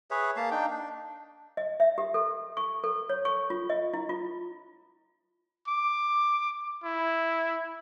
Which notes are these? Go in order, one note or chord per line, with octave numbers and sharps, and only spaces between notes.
G#4 B4 C#5 E5
A#3 F5 A5
D4 D#4 G5
D4
D#5
E5
G4
A4
C#6
A4
C#5
C#6
F4
D#5
E4
F4
D6
E4